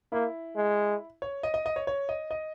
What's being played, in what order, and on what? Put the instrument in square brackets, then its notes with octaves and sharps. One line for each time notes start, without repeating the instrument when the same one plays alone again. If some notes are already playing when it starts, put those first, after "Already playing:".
[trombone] A#3 [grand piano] E4
[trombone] G#3
[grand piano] C#5
D#5
D#5
D#5
C#5
C#5
D#5
D#5